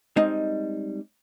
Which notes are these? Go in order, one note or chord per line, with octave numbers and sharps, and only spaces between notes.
G3 G#3 C4 D#4